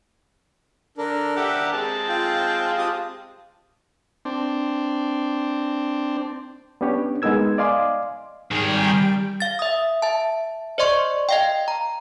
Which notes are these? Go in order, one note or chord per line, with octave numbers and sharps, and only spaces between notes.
D3 D4 A#4
G4 E5 F#5
G#3 C4 A5
F4 G5
F4 G4 D#6
C4 D4
B3 C#4 D4 G4 C#5
G#3 B3 D#4 A#4 E6 G#6
D5 D#5 F5 G#5 C6 D6
D#3 G3 G#4 G5 D7
F5 A6
E5 D#6
E5 A5
C5 D5 D#5 C6 C#6
D#5 F5 G5
A#5